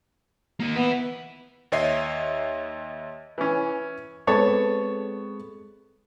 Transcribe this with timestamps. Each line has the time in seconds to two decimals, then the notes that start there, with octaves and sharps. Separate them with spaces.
0.60 A#3 D#4
0.76 B3 B4 E5
1.72 D#2 C#5 D#5 E5 C7
3.38 E3 C#4
4.27 G#3 B3 C4 A4 C#5 A5